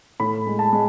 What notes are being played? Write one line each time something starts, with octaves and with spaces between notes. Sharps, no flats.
A2 B5
G#3
A5
G#3